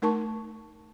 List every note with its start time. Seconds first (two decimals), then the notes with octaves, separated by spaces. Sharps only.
0.02 A3 D#4 A#4 A5 C#6